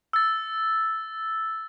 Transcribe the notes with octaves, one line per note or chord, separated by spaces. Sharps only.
E6 A6